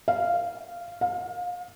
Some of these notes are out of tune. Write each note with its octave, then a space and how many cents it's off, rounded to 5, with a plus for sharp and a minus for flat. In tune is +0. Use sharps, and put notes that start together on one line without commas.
F5 -10
F5 +30